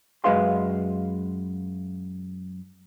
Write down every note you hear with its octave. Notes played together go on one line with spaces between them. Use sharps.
F#2 G#3 B4 F5 C6